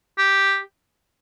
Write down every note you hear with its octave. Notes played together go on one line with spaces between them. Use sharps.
G4